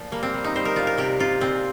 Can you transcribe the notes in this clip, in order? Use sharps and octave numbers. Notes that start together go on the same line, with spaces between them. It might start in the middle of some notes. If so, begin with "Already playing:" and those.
Already playing: A#2 F3
G3 A#3
C4
G3
D#4
G3 C5
A#4
A#2 F4
A#4
C3 G4
C3 F4
A#2 C4